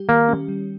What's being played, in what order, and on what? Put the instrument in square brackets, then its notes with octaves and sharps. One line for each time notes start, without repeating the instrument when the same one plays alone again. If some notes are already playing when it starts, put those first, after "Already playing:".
Already playing: [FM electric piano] G3 G4
[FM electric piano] D#3 [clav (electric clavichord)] A#3
[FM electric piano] C#4
G3